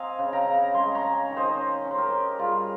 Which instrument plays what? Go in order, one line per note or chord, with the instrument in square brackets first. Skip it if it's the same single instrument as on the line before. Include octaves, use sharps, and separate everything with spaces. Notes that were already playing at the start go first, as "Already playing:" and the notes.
Already playing: [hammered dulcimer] C4 D#5 F5 G#5 A#5
C#3
G5 A#5
C#3
G#3 G#5 C6
A#5 C#6
C#4
D#3
C5 D#5
C#4
C#4
C5
G4 A#4
C#4
G4
G3 F4 G#4